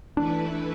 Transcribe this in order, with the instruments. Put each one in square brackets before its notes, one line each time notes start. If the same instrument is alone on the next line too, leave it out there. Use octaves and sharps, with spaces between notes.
[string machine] E3 A3 E4 B4 [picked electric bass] D4